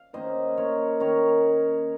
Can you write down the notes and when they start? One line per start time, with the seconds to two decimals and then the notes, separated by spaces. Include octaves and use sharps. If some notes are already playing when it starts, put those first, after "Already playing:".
Already playing: F5
0.13 D#3 A#3 C#4 C5 D#5
0.57 A#4 C#5
1.00 D#3 A#3 C#4 A#4 C#5